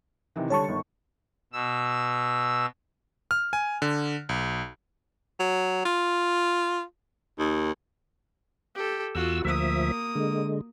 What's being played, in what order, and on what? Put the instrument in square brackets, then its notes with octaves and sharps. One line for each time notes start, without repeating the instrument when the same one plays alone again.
[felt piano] C3 D#3 E3
[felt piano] D3 G3 [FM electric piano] C#5 A5 C#6
[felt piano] G1 D#3
[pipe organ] B2 E6
[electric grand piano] F6
G#5
D3
B1
[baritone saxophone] F#3
F4
D#2
[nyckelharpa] G4 A4
[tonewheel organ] E2 E6 [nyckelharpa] F4 F#4
[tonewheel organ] D2 F3 E5 [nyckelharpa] A#3 D#6
[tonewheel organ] D3 G#3